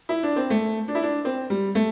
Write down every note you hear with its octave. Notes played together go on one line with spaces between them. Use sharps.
E4
D4
C4
A3
D4
E4
D4
C4
G3
A3